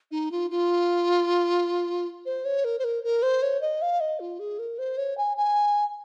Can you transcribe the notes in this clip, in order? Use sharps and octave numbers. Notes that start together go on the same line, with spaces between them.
D#4
F4
F4
C5
C#5
A#4
C5
A#4
A#4
C5
C#5
D#5
F5
D#5
F4
G#4
A#4
C5
C#5
G#5
G#5